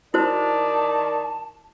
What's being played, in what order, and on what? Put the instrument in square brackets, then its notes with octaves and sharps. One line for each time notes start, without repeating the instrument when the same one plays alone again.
[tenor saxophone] D#3 [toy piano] E4 F#4 C5 [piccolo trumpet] D5 [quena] A5